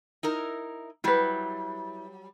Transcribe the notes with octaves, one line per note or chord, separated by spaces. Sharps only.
D#4 E4 A#4
F#3 G3 E4 B4